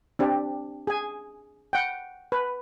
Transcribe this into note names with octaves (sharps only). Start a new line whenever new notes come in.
C4 D4 G4
G#4 G#5
F#5 G5
B4